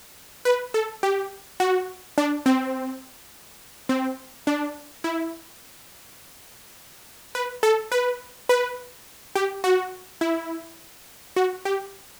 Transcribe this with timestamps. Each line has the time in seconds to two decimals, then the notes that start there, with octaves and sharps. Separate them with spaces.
0.45 B4
0.74 A4
1.03 G4
1.60 F#4
2.18 D4
2.46 C4
3.89 C4
4.47 D4
5.04 E4
7.35 B4
7.63 A4
7.92 B4
8.49 B4
9.36 G4
9.64 F#4
10.21 E4
11.36 F#4
11.65 G4